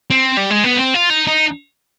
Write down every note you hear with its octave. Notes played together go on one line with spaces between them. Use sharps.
C4
G3
G#3
B3
C4
F4
D#4
D#4